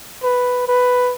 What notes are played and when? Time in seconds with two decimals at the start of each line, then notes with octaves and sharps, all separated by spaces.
0.23 B4
0.68 B4